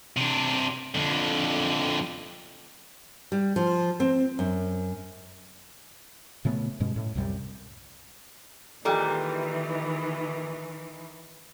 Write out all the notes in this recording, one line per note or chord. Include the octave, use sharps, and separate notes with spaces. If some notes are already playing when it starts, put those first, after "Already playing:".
C3 D4
F2 D3
G3
F3
C4
F#2
A#2 C#3 A3 B3
G2 B2 G#3 C#4
A2
C2 F#2 C3 G3
A#2 D#3 E3 G3 G#3 A4 G5